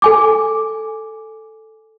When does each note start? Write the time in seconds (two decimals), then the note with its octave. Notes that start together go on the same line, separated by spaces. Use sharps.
0.02 A4 G#5 D6